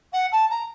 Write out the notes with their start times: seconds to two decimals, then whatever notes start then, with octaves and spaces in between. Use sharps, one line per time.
0.12 F#5
0.32 A5
0.50 A#5